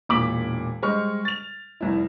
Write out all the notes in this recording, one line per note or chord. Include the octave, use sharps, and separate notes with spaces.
E1 A#2 D6 B6 F#7
G3 G#3 C5 D#5 C#6 F6
A6 F7
F1 C2 E4